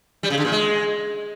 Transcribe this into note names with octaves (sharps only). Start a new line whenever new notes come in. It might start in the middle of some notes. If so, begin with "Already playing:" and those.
G3
C#3
D3
A#2
G#3